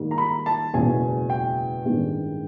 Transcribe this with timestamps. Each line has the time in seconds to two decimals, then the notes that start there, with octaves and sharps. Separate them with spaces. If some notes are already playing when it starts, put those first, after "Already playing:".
Already playing: G#2 D#3 G3 A#3
0.11 A#5
0.18 B5
0.46 A5
0.73 F#1 E2 B2 G#3 C#4 G#5
1.30 G5
1.85 A1 G2 D#3 G#3